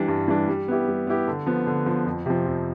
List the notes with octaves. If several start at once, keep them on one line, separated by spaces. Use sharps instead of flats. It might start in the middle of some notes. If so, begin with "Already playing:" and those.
Already playing: E3 G3 D4
G2
E3 G3 D4
G3
B3 E4 G4
G3
B3 E4 G4
D3
F3 B3
D3
F3 B3
F2
C3 F3
F2